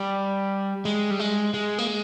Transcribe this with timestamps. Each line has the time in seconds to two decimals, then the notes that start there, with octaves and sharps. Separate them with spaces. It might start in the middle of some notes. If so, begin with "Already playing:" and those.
Already playing: G3
0.85 G#3
1.11 G3
1.19 G#3
1.53 G#3
1.79 A#3
1.87 G#3